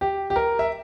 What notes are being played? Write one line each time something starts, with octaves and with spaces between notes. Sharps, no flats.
G4
G4
A#4
E5